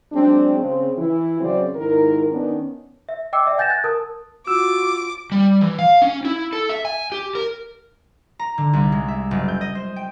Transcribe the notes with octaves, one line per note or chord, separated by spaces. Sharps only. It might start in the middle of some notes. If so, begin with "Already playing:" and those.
F#3 G#3 C4 D4
C#3 C4
E3 E4
F#2 C#3 F#3 C4 C5 D5
G#2 D#3 E4 A#4
D#3 B3 C#4 D4
E5
D#5 G5 D6 E6 C#7
D5 E5
F#5 G#5 G6 A6 A#6 E7
F#6 G#6 A6
A#4 A5 D#6
F4 F#4 D6 E6
G3
E3
F5
C#4
E4
A4
E5
G#5
G4
A#4
A#5
D3
C2
G#3
E5
F#1
G6
D#5
C5
G5